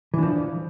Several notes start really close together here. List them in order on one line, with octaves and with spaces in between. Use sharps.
E3 D4 F3